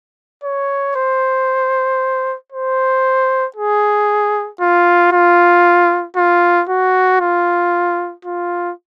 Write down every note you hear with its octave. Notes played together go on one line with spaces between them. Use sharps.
C#5
C5
C5
G#4
F4
F4
F4
F#4
F4
F4